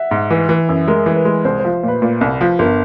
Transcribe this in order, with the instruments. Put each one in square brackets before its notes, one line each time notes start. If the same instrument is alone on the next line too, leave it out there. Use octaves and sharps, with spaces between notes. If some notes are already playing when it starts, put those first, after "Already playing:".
Already playing: [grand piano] E5 F#5
[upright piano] G#2
E3
E3
F#2
[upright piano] G#3 [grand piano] A#4
[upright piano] E3
[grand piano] B4
[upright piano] G#3
[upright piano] C2 [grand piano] C5
[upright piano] F3 [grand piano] C5
[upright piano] A#2 [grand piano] B4
[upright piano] A#2
C2
F3
[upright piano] G1 [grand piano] A#4